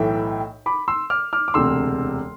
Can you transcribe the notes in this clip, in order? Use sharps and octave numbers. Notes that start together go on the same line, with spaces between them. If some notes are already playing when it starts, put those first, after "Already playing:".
Already playing: B1 A2 E3 A3 E5 G5
B5 D6
C6 E6
D6 F6
D6 F6
D6
E1 D2 C3 C6 E6